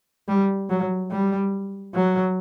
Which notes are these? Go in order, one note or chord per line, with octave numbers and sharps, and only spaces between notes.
G3
F#3
G3
F#3